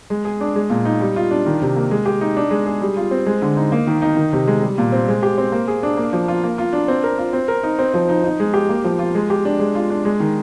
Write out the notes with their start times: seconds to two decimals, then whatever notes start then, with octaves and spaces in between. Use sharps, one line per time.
0.10 G#3
0.25 G#4
0.41 D4
0.56 G#3
0.70 A#2
0.85 D#4
1.01 G3
1.16 F4
1.31 D4
1.46 D#3
1.62 C3
1.76 A#3
1.91 G#3
2.06 G4
2.21 D#4
2.37 D4
2.51 G#3
2.66 G#4
2.81 G3
2.97 F4
3.11 C4
3.26 G#3
3.42 D3
3.57 D#4
3.72 A#3
3.87 D#3
4.02 D#4
4.17 D#3
4.33 C3
4.47 G#3
4.62 G3
4.78 A#2
4.92 C4
5.08 G#3
5.23 G4
5.38 C4
5.52 A#3
5.67 G#4
5.83 D4
5.97 A#3
6.13 F3
6.28 F4
6.44 A#3
6.58 F4
6.73 D4
6.88 C4
7.04 A#4
7.18 F4
7.33 C4
7.48 A#4
7.63 D#4
7.79 C4
7.94 F3
8.09 D#4
8.24 D#4
8.40 G#3
8.54 G4
8.69 A#3
8.84 F3
8.99 F4
9.15 G#3
9.30 G4
9.45 D4
9.60 G#3
9.75 F4
9.90 D4
10.05 G#3
10.20 D#3